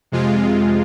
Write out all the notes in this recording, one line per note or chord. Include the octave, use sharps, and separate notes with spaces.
F2 C3 G#3 F4